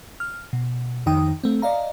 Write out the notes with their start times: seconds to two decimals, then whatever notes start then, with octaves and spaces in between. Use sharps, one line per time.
0.20 F6
0.53 B2
1.06 F2 D#3 D#4 G5 D#6
1.44 A3 C4
1.62 D5 D#5 F5 A#5